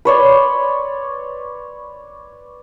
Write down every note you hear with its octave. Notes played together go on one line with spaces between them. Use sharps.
B4 C#5 D5 C6